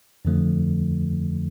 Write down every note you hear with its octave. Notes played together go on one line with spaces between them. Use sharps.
F2 D3 F3 A3